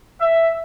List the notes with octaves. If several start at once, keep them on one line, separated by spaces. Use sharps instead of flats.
E5